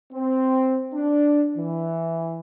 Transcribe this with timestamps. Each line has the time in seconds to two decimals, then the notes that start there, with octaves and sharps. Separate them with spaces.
0.13 C4
0.93 D4
1.56 E3